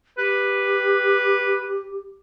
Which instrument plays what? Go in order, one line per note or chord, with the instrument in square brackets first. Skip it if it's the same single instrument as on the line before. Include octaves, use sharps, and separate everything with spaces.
[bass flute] G4 [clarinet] B4